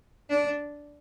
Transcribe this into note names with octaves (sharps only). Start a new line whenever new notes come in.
D4